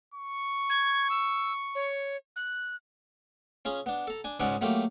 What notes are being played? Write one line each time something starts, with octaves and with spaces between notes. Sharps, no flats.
C#6
G#6
E6
C#5
F#6
C#4 F4 G#4
B3 D4
A4 A#5
D4 G#5
C#2 G#2 G#3 C#4 D5 F#5
F#3 A3 A#3 F4 G4